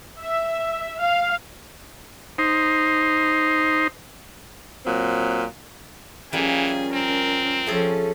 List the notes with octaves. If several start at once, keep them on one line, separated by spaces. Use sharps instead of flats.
E5
F5
D#4 C5
A#2 F#3 C4
E3 F3 G3 A#3 C#4 G#4
C4 A#4
F3 A3 C#4 G#4 A4